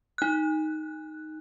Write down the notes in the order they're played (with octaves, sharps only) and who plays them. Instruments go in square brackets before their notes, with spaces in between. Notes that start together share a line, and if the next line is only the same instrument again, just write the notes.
[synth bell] D#4 F#6